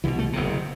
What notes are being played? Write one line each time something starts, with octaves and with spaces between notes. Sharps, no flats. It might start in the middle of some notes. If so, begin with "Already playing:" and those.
C2 B2 E3
A3
F#1 E2 C3